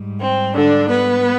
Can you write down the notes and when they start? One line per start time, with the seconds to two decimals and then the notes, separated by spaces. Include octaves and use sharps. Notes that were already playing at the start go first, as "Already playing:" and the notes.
Already playing: G#2 G3
0.20 C4
0.55 D3 D4
0.89 B3 B4